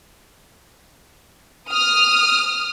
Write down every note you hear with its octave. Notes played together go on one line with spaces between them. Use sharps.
D#6 F6